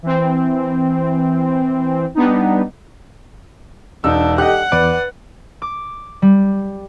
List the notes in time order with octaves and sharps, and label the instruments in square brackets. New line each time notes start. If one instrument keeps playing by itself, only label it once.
[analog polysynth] E3 C4
G3 B3 D4 D#4
[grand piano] E1 D#4 E6 [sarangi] D4
[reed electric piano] G4 A4 D#5 [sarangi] F#5 [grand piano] F#6
[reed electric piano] E2 D6 [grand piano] B4 D5
[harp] D6
G3